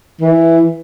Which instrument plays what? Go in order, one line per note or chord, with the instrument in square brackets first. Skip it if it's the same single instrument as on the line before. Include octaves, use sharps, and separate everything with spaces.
[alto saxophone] E3